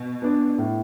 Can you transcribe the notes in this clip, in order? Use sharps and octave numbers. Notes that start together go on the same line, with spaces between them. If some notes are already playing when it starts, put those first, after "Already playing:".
Already playing: B2
B3 D4
A2